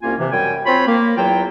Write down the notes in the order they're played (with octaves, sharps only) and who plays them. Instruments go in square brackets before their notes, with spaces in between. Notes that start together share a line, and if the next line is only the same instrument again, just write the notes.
[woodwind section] C2 A#3 C#4 F4 G#5
C3 E3
F#2 G3 G5 G#5
C4 F4 C#5 B5
A#3
E2 F#3 F4 G5